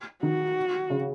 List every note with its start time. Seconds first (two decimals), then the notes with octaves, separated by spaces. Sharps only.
0.23 D#3 F#4
0.90 C#3